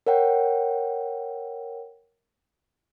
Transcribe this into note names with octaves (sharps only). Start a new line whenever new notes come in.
A#4 C#5 F#5 G5